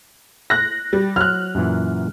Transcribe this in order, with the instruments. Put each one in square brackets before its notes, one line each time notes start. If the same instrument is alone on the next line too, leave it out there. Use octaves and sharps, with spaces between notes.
[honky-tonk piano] F#6 A#6
G3
[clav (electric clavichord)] F#3 [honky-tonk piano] F6 F#6
[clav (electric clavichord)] F#2 A#2 E3